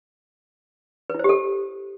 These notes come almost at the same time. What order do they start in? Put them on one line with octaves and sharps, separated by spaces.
B4 E4 C5 G4 A4